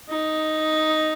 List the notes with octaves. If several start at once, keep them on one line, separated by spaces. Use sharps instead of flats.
D#4